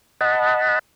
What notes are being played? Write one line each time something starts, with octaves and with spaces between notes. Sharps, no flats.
D#5 F#5 A5 B5